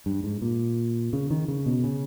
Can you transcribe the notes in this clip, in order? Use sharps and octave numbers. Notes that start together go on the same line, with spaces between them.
G2
G#2
A#2
C#3
D#3
C#3
B2
C#3